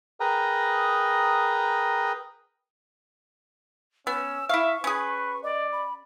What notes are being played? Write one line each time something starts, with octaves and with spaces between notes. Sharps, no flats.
G#4 A#4 B4 G5 A#5 D#6
B3 C#4 E6
E4 E5 F5 C#6
C#4 G#4 B4
D5 D#5
B5